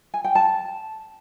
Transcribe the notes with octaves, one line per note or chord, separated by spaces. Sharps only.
G#5
G5
A5